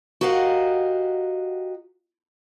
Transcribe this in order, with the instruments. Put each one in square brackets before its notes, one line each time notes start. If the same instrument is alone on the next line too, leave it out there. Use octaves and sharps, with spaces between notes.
[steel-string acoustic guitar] F#4 G4 A#4 D#5 F5 F#5